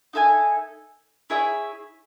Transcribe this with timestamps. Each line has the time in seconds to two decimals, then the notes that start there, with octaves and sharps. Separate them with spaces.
0.13 D#4 A4 E5 G#5
1.30 E4 G#4 C#5 E5